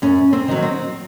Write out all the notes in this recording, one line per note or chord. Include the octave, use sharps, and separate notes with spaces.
F#2 C#4
C4
D#3 F#3
C4